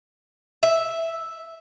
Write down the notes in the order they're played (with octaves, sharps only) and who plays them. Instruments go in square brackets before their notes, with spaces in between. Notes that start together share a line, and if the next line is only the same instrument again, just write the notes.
[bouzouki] E5